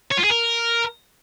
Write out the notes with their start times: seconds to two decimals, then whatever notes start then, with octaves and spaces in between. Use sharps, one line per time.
0.11 C#5
0.17 F4
0.24 G#4
0.30 A#4